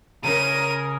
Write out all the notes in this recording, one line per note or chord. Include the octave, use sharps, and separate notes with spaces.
C#3 A#4 D#7